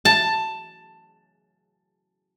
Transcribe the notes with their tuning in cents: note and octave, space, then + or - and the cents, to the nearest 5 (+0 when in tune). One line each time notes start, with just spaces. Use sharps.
A5 +10